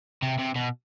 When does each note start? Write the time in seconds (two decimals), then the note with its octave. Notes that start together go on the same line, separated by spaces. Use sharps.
0.22 C3
0.39 C3
0.56 B2